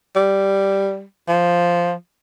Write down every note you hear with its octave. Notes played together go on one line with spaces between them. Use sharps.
G3
F3